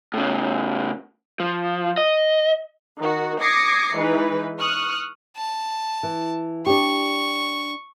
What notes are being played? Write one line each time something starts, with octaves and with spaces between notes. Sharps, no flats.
A2 C#3
F3
D#5
D#3 F#4
D6 D#6 G#6 A#6 C7 C#7
E3 G#3 D#4 B4
C#6 D#6 F6 F#6
A5
E3
D4 G4 C#6